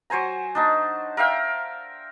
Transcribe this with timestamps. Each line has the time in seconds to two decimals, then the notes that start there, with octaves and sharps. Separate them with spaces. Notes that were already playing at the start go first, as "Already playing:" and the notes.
0.10 F#3 C5 G#5 A#5
0.55 D4 D#4 A5
1.17 A#4 E5 F5 G5